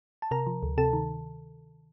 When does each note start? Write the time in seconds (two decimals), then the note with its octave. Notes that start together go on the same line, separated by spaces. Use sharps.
0.22 A5
0.31 C3 A#4 A#5
0.47 F3
0.63 D2
0.78 C3 A4 A5
0.93 D#3